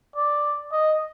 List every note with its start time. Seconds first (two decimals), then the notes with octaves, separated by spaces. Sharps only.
0.16 D5
0.72 D#5